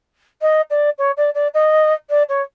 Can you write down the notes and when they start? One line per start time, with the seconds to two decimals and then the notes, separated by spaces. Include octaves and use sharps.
0.42 D#5
0.70 D5
0.98 C#5
1.17 D5
1.35 D5
1.54 D#5
2.10 D5
2.29 C#5